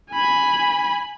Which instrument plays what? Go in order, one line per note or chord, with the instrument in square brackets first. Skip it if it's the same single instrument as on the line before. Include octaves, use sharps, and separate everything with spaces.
[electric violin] G#5 B5